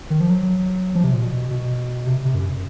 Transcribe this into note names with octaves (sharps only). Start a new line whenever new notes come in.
D#3
F3
F#3
F3
C3
A#2
B2
B2
C3
C3
F#2